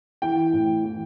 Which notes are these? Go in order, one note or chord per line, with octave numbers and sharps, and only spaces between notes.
E3 G5
A2
E3